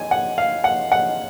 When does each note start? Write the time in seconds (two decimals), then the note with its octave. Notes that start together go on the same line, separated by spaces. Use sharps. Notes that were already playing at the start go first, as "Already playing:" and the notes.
Already playing: G#5
0.11 F#5
0.38 F5
0.64 F#5
0.92 F#5